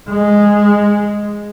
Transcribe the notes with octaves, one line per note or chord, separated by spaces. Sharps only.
G#3